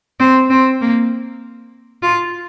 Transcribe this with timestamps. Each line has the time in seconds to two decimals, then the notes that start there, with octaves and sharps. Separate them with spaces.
0.20 C4
0.50 C4
0.81 A#3
2.02 F4